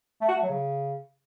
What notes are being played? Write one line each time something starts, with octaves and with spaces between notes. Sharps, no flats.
A3
F#4
A3
F#3
C#3